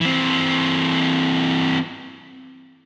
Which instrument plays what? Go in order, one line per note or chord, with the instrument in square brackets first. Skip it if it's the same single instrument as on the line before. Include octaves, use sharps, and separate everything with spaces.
[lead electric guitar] E3 C4